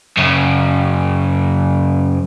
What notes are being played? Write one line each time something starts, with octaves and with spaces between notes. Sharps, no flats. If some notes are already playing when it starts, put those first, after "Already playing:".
F#2 C#3